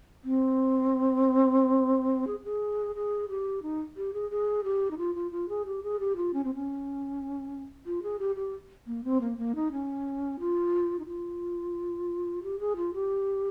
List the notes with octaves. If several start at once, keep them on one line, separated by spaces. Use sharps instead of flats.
C4
G#4
G#4
G#4
G4
D#4
G4
G#4
G#4
G4
D#4
F4
F4
F4
G#4
G4
G#4
G4
F4
C#4
C4
C#4
F4
G#4
G4
G4
A#3
C4
A#3
A#3
D#4
C#4
F4
D#4
F4
G4
G#4
F4
G4